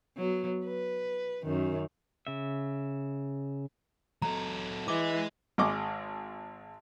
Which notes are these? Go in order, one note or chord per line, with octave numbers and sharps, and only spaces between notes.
F#3 B3
B4
F#2 D#3
C#3 E5
F#3 A4 A#5
E3 G#4 D#5 D6
G#1 G#3 D#5 C#6 D6